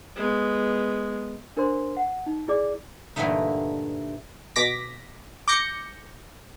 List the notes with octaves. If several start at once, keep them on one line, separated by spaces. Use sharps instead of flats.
G#3 B3
D4 A#4 C5 C6
F#5
D#4
E4 G#4 D5 D6
G2 A#2 D3 E3 A3 D#4
B2 D6 A#6 B6
D6 G6 A#6 C#7